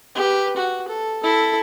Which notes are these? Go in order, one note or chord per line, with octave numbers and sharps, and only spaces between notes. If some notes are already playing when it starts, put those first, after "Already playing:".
G4 B4
F#4
A4
E4 A4